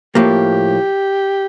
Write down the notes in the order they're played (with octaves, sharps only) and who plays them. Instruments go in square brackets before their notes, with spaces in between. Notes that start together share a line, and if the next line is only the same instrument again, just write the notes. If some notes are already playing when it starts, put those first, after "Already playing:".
[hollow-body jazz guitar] A2 F3 A#3 [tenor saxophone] G4